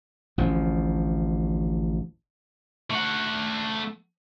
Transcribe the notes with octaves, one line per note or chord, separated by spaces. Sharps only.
A1 D2 F3
A3 F#5